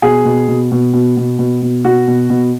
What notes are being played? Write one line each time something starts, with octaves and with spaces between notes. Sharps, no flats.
B2 G#4
B2
B2
B2
B2
B2
B2
B2
B2 F#4
B2
B2